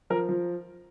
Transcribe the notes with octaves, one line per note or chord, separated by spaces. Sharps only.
F3 A#4
F3